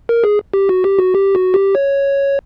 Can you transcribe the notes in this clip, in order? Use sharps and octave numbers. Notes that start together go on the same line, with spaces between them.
A#4
G#4
G4
F#4
G4
F#4
G4
F#4
G4
C#5